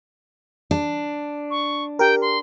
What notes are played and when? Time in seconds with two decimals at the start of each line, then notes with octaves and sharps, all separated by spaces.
0.71 D4
1.51 C#6
1.99 G4 A#4 G5
2.22 C6